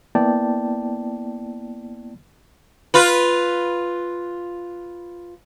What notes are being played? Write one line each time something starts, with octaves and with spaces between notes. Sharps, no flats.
A#3 B3 E4 D5 G5 A5
F4 B4